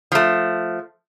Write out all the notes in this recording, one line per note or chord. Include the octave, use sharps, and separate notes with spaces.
F3 A3